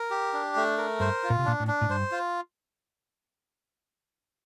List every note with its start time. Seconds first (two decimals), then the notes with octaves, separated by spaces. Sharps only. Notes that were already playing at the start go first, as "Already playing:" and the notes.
Already playing: A#4
0.11 G4
0.33 D4
0.56 A3
0.78 A#4
1.00 G2 C5
1.23 F4
1.30 A#2
1.39 C3
1.45 A#2 D4
1.60 A2
1.68 D4
1.81 A2
1.89 G2 C5
2.12 F4